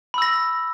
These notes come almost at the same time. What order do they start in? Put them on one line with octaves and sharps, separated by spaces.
B5 E6 A#6